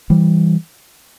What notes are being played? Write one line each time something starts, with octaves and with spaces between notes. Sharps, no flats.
E3 G3